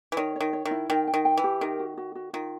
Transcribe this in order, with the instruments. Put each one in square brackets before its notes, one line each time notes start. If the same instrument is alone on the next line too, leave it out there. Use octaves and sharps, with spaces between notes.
[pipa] E3
[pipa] D#3 [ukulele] C#5
[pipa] D#3 [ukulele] C#5
[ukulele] C#5
[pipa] D#3
[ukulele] E4
[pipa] D#3 [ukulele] G5
[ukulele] G5
[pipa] D#3
[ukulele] G5
[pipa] E3
[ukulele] G4
[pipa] D#3 [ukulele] A#4
[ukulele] F#4
F#4
F#4
[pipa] D#3 [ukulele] F4